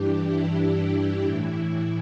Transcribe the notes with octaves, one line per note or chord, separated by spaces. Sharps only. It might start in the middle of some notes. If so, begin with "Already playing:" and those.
Already playing: G2 E3 D4 G4
E4
A2 E3